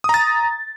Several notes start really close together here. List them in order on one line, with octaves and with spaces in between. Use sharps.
D#6 A#5 A6